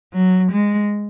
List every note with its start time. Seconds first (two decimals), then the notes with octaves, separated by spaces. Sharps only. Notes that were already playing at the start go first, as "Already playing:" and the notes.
0.13 F#3
0.52 G#3